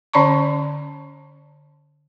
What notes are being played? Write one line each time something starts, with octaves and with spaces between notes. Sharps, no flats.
D3 C#4 D5 A5 A#5 C#6